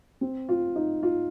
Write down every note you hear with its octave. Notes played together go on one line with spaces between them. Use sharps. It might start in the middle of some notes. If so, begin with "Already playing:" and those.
C4
F4
D#4
F4